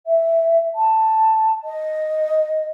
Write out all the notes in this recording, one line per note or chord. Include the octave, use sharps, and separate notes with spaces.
E5
A5
D#5